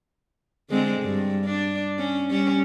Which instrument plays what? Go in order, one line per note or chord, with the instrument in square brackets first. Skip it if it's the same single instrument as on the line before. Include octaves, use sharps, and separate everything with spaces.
[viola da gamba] D3 G#3 C4
G2
D4
C#4
G3 C#4